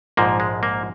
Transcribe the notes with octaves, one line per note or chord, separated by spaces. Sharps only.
A#1 G#2 F3 A#3
G#3
A#3